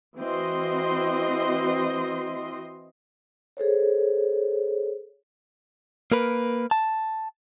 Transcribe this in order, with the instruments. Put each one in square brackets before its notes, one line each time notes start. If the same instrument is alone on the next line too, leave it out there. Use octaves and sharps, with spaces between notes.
[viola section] E3 C4 F#4 D#5 C6
[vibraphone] G#4 A4 C5 C#5
[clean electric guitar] A#3 A#4 B4
A5